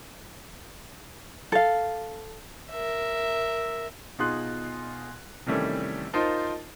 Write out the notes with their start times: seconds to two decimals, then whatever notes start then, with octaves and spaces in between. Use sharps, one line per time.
1.52 A4 F5
2.70 A#4 E5
4.19 B2 D#4 F4 G#4 C6 F#6
5.46 C3 D#3 E3 G3 A3 C#4
6.13 D#4 F4 A#4 C5 A5